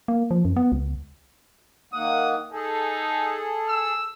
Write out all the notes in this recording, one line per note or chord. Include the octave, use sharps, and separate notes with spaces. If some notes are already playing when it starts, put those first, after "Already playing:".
A#3
F3
F#2
B3
C#2
D#3 A#3 F#5 D#6
D#4 G#4 A4
E6